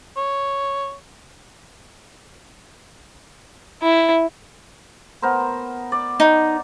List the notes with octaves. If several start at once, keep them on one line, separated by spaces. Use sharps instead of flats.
C#5
E4
B3 A#4 C5
D5
D#4